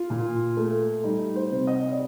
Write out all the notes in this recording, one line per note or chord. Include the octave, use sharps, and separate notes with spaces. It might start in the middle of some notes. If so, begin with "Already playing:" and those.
Already playing: F4
A#2
A3
G3 D#4
C5
C3
D#5
D5